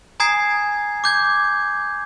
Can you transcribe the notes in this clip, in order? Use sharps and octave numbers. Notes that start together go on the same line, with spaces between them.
G#5 A#5 D#6 G#6 C7
D6 G6 G#6